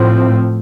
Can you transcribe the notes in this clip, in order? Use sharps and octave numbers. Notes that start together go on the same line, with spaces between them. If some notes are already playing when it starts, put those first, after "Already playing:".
Already playing: A2 F3 C4